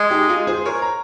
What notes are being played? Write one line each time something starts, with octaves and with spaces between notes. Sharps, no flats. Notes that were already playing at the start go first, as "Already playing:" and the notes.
Already playing: G#3
D#4 G4
F4 G#4
G#4 C5
A#4 C#5
A#5